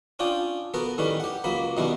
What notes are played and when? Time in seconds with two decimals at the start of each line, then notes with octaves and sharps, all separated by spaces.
0.19 C#4 D4 F4 G5 D#6
0.74 B3 F#4 A4 A#4
0.98 A2 D#3 G3 C#4 B4
1.20 G4 F#5
1.44 C#2 F#3 A#3 B5
1.77 F#2 B2 D#3 F#3 G3 E4